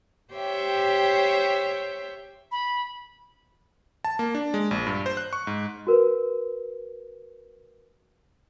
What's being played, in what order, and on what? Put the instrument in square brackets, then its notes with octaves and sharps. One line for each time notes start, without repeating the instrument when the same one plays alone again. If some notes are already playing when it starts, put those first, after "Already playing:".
[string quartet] G4 C5 C#5 E5 G5
[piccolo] B5
[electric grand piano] A5
A#3
D4
G#3
A#1
G2
C5
F#6
C#6
G#2
[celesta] F#4 A#4 B4